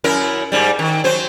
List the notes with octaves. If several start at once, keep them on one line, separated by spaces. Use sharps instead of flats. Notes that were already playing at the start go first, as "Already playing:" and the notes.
F#2 E4 A#4
G#2 G3
D#3
F#3 C5